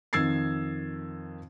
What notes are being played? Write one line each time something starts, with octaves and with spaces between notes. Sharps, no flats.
F2 D#3 E6 G#6 A6 C7